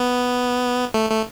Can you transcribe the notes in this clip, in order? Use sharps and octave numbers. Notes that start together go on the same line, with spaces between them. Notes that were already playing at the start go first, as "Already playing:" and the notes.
Already playing: B3
A3
A3